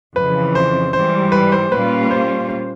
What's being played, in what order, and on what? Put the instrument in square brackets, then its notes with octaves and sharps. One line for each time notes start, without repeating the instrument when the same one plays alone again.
[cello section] F2 C#3 E3 [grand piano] B4
[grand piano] C5
[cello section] G#2 E3 G3 [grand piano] C5
[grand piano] B4
C5
[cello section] A#2 G3 A#3 C#4 F4 [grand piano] B4
[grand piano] C5
C5